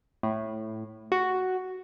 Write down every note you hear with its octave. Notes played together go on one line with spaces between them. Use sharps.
A2
F#4